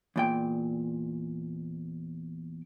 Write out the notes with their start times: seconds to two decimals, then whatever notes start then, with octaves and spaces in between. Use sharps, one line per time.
0.16 E2 A#2 G5